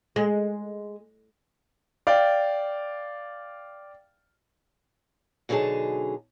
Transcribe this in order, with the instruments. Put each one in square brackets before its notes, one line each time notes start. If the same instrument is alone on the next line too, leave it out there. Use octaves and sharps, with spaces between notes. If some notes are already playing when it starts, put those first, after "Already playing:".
[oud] G#3
[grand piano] D5 F5 G5
[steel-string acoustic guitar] B2 D3 F#3 D#4 G#4 A5